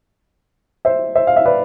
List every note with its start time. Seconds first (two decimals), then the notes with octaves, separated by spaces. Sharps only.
0.85 C5 E5
1.15 C5 E5
1.27 F5
1.36 E5
1.46 B4 D5